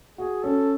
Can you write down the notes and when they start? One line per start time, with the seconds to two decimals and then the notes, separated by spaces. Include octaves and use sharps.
0.18 F#4 G#4
0.43 C#4 A4